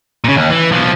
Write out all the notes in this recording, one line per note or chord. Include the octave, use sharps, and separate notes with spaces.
A#2 C#3
D#2
E3
B1 F3